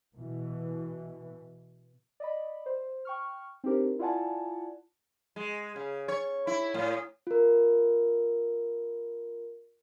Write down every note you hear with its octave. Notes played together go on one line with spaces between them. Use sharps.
B2 E3
D5 D#5 B5
C5
G5 C#6 F6
C4 D4 D#4 G4 A#4 C5
E4 F4 D5 F#5 G#5 A5
G#3
C#3
C#5
E4
A2
F4 A#4